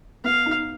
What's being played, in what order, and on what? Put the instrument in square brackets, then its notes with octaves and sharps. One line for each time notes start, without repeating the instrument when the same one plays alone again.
[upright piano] B3 [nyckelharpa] F5
[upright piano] D#4